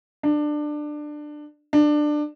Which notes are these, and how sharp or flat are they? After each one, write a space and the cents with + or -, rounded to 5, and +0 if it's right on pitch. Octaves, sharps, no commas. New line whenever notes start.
D4 +20
D4 +20